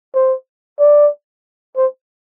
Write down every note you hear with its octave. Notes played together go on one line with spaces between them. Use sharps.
C5
D5
C5